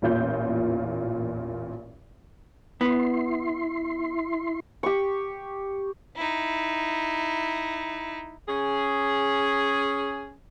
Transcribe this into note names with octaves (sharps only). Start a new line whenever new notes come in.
A1 E2 A#2 F4 G6
B3 E4 C6
G4 C#6
D#4 E4
C#4 G#4